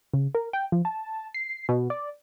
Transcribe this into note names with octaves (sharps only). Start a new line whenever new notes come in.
C#3
A#4
G5
F3
A5
C7
B2
D5